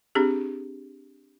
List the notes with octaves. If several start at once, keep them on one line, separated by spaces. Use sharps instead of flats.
C4 D4 G4 G#4